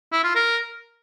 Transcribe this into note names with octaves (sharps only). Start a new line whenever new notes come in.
E4
F4
A#4